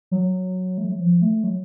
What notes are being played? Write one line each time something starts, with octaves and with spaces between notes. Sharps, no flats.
F#3
A3
F#3
F3
A3
F#3